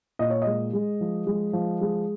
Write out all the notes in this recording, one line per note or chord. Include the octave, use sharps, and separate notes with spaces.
A#2 D#5
C#5
G#3 D#5
G#3
F3
G#3
F3
G#3